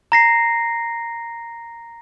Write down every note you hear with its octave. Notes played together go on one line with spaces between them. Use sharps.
A#5 A#6 C7